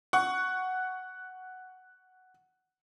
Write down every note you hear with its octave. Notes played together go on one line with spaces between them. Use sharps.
F#5 C#6